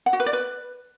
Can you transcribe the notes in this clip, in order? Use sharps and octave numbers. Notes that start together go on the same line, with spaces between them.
F#5
F#4
B4
D5
B4